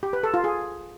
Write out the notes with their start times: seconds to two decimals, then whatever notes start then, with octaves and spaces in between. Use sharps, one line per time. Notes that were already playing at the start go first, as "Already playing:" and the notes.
0.03 G4
0.13 B4
0.23 A4
0.34 F4
0.44 G#4